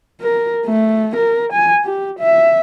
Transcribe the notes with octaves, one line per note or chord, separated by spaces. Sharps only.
A#4
A3
A#4
G#5
G4
E5